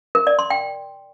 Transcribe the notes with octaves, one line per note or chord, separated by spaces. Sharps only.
A#4
D5
C6
G5